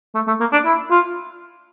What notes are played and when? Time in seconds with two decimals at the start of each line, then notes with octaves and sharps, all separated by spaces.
0.15 A3
0.27 A3
0.40 A#3
0.52 D4
0.65 E4
0.91 F4